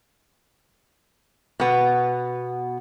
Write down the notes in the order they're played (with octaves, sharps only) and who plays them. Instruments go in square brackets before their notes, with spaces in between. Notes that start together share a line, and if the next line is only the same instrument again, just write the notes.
[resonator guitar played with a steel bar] B2 B3